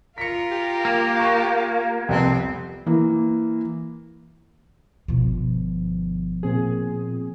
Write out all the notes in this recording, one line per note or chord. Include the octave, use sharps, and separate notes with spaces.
F4 A#4 B6 C#7
G4
A#3
C#6 F#6 G6
C2 F2 C3 B3 C4
E3 A#3
G1 B2 F3
A#2 C4 G#4